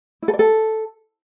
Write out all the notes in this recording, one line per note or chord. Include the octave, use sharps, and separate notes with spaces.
E4
A4
D5
A4